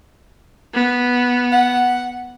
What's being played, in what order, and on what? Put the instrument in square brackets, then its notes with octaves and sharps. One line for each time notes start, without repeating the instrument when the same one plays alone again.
[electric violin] B3
[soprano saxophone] F#5